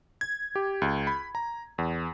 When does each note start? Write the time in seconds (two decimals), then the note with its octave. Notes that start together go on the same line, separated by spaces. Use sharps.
0.21 G#6
0.56 G4
0.82 C#2
1.07 B5
1.35 A#5
1.78 E2